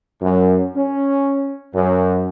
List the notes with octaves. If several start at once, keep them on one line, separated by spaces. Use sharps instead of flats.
F#2
C#4
F#2